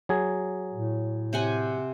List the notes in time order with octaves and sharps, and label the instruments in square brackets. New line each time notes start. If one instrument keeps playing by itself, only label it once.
[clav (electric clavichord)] F#3 G#4
[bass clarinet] A2
[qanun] C3 F#5 G#5